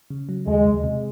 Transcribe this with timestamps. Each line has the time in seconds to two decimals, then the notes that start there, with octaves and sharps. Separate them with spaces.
0.10 C#3
0.29 F#3
0.47 D#2 G#3
0.65 D#2
0.84 C3